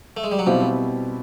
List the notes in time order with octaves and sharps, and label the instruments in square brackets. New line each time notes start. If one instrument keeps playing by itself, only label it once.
[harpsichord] A3
G#3
G3
F#3
[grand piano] B2 G3 C4 E4 G4 [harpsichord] F3